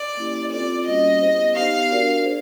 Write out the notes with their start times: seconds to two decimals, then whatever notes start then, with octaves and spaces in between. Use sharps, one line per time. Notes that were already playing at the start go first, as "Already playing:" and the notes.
Already playing: D5
0.17 A#3 C#4 E4 G4
0.51 C4 F4 A4 C5 D5
0.86 G3 A#3 C#4 F#4 D#5
1.21 B3 E4 G4 C5
1.55 B3 D#4 G4 F5
1.90 D4 F#4 A#4 D5
2.25 G#4 C5